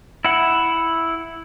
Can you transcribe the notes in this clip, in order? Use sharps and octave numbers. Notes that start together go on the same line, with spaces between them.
E4 F#5